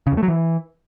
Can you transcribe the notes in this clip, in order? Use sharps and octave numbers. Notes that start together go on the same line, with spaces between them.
C#3
E2
A3
F#3
E3